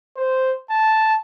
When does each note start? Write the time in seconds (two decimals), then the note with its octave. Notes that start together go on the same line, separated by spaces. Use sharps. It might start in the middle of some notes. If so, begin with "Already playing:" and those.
0.17 C5
0.70 A5